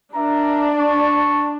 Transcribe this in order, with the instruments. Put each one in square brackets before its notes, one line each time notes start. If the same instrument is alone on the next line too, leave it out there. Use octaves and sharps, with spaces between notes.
[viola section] D4 [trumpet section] A#4 E5 A#5
[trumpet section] A5 C#6